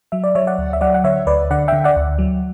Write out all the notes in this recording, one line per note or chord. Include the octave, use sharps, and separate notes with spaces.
F#3 E5
D5
F#3 C#5 E5
D5 F#5
D2
E5
F#3 D5 F#5
F#5
D3 C#5 E5
D2 B4 D5
D3 D5 F#5
D3 E5 G5
D5 F#5
D2
F#3